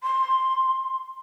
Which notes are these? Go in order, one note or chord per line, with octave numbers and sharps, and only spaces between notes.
C6